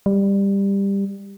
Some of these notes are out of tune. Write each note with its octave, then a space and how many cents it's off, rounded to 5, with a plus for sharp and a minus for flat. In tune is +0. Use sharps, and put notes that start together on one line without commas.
G3 +15